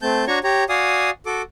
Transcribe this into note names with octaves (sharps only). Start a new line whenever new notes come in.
A3 C4 A5 G6
D4 F#4 C#5 A#5 C#6
G4 C#5 A#5
F#4 D5 F5 G#5 D#6
F#4 A4 D6